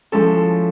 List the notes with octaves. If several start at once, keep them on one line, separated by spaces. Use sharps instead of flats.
F3 G#3 C#4 E4 A4